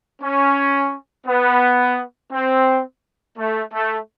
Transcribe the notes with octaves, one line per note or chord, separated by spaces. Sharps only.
C#4
B3
C4
A3
A3